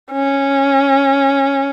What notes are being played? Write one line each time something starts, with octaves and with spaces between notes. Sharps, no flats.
C#4